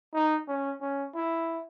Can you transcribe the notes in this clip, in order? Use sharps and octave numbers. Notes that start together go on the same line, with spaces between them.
D#4
C#4
C#4
E4